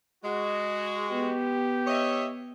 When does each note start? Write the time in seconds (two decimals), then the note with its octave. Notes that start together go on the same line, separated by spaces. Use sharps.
0.24 G#3 F#4
1.09 B3 G4
1.87 C#5 D#5 E5